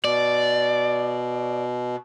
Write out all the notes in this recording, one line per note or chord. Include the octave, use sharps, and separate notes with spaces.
B2 D5